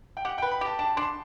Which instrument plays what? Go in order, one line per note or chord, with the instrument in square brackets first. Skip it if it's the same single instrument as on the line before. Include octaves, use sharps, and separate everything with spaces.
[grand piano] G5
[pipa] G4 [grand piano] F#5
[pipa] B4 [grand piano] G5
[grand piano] B5
[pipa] G4 [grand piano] A5
[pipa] D4 [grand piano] A5
[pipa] D4 [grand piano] C6